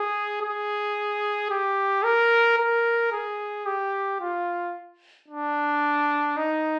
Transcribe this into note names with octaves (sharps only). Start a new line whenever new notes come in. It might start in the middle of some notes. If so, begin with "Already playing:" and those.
Already playing: G#4
G#4
G4
A#4
A#4
G#4
G4
F4
D4
D#4